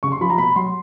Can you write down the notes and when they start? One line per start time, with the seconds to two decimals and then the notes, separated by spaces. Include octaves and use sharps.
0.03 C#3 C#6
0.12 C6
0.21 F3 B5
0.30 A#5
0.38 B2 B5
0.56 F#3 C6